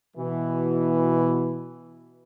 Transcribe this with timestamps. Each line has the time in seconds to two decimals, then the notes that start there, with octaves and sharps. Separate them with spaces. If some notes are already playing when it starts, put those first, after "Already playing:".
0.17 B2 E3